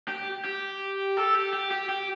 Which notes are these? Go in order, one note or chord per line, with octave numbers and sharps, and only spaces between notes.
G4
G4
A4
G4
G4
G4
G4